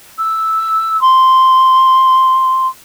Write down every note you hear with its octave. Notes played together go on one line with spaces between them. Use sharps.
E6
C6